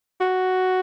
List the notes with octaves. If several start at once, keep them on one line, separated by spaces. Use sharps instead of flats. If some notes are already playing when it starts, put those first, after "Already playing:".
F#4